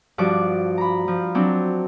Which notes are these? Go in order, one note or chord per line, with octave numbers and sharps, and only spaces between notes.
G2 F3 F#4 D5 D6
A#5 B5
F3
F#3 C4 D4